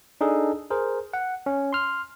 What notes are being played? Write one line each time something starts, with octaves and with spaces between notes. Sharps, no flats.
D4 D#4 G#4 A4
G#4 A#4 C5
F#5
C#4
C6 F6